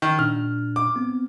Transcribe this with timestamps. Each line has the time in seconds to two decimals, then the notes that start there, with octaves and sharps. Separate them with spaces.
0.02 D#3
0.19 A#2 D4 F6
0.76 D6
0.96 B3 C4